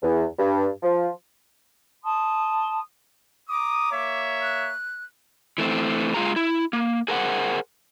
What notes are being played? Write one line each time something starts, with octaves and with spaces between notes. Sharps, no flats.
E2
G2
F3
A5 C6 D#6
A#5 D6 D#6
A#3 C#5 E5
F#6
E3 A3 C4
G#3 F4 G#4 A#5
E4
A#3
G#4 A#4 C5 F#5